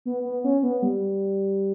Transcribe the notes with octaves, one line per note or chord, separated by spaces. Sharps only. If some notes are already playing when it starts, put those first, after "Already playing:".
B3
B3
C#4
B3
G3